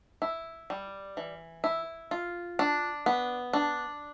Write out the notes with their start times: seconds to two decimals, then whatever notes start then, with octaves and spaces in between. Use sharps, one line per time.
0.22 E4
0.70 G3
1.17 E3
1.64 E4
2.11 F4
2.59 D4
3.06 B3
3.53 D4